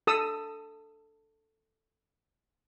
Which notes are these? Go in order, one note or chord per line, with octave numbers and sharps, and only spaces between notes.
A4 D#6 E6